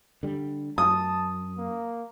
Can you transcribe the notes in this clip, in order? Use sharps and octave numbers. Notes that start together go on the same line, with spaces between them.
D3 G3
F#2 A5 D#6
A#3